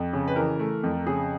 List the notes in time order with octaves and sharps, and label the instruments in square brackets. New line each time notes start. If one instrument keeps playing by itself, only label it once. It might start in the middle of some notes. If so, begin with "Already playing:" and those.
Already playing: [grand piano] F2
C#3
B4
E3 A#4
A3
F2
C#3 G#4